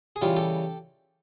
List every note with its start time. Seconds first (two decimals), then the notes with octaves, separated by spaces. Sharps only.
0.16 G#4
0.21 C#3 E3 G3 F4 G4
0.36 G4 A4